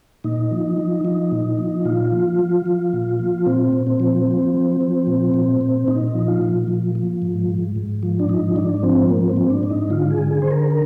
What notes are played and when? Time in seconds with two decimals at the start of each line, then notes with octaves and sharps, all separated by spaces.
0.24 A#2 D#4
0.51 F3
0.78 F3
1.05 F3 D#4
1.32 A#2
1.58 F3
1.85 A#2 F4
2.12 F3
2.39 F3
2.66 F3
2.93 A#2
3.19 F3
3.46 A#2 C4
3.73 A#2
3.87 C4
4.00 F3
4.27 F3
4.54 F3
4.81 F3
5.07 A#2
5.34 A#2
5.61 A#2
5.88 A#2 D#4
6.08 D#4
6.14 F3
6.28 F4
6.41 A#2
6.68 F3
6.95 F3
7.22 G#2
7.49 G#2
7.76 G#2
8.03 F3
8.19 D4
8.29 G#2 D#4
8.56 G#2 D4
8.83 F3 C4
9.10 G#2 A#3
9.30 C4
9.37 G#2
9.50 D4
9.63 G#2
9.70 D#4
9.90 D3 F4
10.11 G#4
10.17 D3
10.31 G#4
10.42 D3 C5
10.51 A#4
10.71 A#4